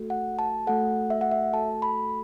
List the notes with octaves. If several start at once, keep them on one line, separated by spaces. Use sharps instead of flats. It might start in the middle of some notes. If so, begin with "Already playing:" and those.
Already playing: A3 F#4 A4
F#5
A5
A3 F#4 A4 F#5
E5
F#5
E5
A3 F#4 A4 A5
B5